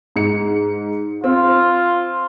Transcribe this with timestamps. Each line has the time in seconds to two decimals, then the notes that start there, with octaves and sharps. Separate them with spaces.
0.16 G#2 C#7
1.24 C4 F4